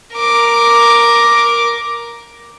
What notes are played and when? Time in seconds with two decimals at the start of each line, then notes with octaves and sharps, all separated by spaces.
0.15 A#4 D6